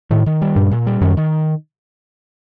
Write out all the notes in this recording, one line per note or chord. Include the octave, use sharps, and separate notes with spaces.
A2 D#3
D#3
G3
G2 A#2
A#2
G3
F#2 D#3
D#3